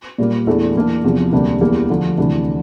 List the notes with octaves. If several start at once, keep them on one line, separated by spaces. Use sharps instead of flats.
A#2 G3 A#3
E2 E3 A3 D4
E3 A#3 D4
E2 C3 F3
D2 C3 G3 A#3 D4
E2 E3 G3 A#3
D3 F3 A3
D2 C3 E3 A3 D4